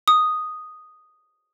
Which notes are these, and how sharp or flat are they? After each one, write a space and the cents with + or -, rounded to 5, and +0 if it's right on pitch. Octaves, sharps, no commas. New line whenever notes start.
D#6 -5